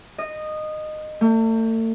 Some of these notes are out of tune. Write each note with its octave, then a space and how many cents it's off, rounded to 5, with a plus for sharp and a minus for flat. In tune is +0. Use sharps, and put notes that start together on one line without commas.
D#5 -15
A3 +40